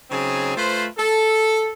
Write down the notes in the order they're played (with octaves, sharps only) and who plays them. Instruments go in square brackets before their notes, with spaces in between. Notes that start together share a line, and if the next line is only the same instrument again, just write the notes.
[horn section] C#3 F#3 C4 D#4 G#4
A3 F4 B4 C5
A4